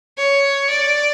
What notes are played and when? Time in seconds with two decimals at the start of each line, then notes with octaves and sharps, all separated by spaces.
0.18 C#5
0.70 D5